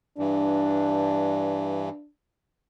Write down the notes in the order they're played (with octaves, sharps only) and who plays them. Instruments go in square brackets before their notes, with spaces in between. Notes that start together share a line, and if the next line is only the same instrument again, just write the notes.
[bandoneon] G2 E3 [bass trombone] D4